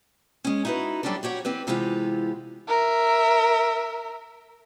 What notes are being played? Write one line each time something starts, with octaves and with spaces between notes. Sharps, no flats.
G#3 C#4
D#4 E4 F#4 G#4 B4
F#3 G3 C#4 D4 G4 A4
F#4 G4 C#5 F#5
E3 C4 G4 B4
C3 E3 G#3 B3 F4 G4
A#4 E5